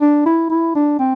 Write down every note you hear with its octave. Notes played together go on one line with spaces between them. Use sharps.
D4
E4
E4
D4
C4